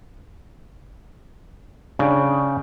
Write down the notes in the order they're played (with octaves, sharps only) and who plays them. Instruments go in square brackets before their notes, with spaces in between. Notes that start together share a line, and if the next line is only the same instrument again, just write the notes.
[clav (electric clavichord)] C#3 G5 [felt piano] D4